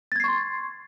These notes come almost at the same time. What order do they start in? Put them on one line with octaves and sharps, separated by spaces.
A6 G#6 C7 C#6 C6